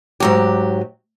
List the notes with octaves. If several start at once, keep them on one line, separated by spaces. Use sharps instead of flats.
G#2 F#3 G4